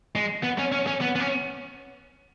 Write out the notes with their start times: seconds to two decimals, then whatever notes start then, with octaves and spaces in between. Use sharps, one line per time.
0.16 G#3
0.43 B3
0.59 C#4
0.72 C#4
0.87 C#4
1.01 B3
1.16 B3
1.20 C#4